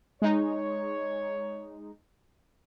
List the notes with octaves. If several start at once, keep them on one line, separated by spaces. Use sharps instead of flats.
G#3 D#4 C#5